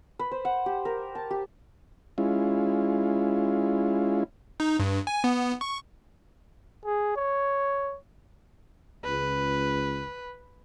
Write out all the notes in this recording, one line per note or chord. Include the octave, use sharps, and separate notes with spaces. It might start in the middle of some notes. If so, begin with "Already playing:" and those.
B4
C5
F#5
G4
A#4
A5
G4
G#3 C#4 E4 F4
D#4
G2
G#5
B3
C#6
G#4
C#5
C#2 B4